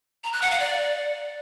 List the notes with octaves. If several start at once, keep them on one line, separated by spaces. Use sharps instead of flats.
A#5
F#6
F#5
F5
D5